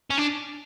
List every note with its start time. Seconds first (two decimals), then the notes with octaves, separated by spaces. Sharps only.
0.11 C#4
0.18 D4